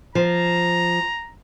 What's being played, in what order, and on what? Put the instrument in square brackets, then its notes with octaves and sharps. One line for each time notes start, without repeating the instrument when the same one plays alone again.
[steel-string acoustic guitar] F3 [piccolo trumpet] A#5